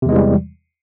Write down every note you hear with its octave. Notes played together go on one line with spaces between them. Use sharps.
E2 C3 E3 G3 G#3